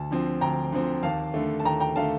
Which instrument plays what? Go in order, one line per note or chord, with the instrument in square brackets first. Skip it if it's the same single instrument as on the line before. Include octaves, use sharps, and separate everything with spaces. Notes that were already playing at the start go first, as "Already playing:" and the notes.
Already playing: [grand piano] D2 A5
D3 F3 C4
D2 G5 A#5
D3 F3 C4
D#2 F5 A5
D3 A3
A5
D#2 G5 A#5
G5 A#5
D3 A3 F5 A5